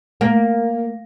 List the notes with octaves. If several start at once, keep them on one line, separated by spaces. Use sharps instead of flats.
A#3